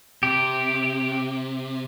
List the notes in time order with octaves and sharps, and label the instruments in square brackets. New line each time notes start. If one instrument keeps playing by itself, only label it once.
[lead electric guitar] C3 [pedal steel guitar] G4